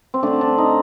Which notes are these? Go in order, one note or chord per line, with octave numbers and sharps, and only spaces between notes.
C4
D3 A3 D4
D4
D#4